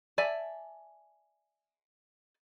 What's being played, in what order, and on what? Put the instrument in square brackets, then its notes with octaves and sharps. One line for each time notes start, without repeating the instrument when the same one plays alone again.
[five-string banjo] D5 E5 G#5 A5